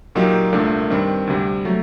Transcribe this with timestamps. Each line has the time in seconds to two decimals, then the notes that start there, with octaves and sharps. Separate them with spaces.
0.15 A#2 F#3 A#3 D#4 G4
0.53 C2 A#2 A3 D4
0.90 G2 D#3 G3 C4
1.27 D2 C3 G3
1.65 F#3 A3